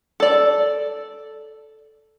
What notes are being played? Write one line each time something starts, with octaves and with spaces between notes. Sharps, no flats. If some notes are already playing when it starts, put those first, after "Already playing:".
A4 D5